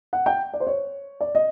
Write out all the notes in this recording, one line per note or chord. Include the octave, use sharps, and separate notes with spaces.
F#5
G5
D5
C5
C#5
D5
D#5